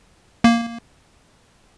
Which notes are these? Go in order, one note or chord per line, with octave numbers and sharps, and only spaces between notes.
A#3